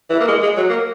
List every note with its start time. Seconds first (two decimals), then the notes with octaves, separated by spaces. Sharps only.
0.10 E3
0.20 A#3
0.28 G#3
0.42 G#3
0.56 F#3
0.69 A#3